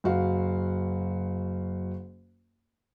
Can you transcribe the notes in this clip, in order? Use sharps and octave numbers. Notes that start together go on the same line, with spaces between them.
F#1 F#4 F5